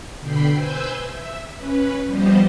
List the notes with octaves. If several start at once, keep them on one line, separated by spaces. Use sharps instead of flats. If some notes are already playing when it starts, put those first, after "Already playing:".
B2 D3 G5 B5 C7
B4 C5 G#5 E6 G6
E5
C#4 B4
F3 G3 B3 G4 C5 D#5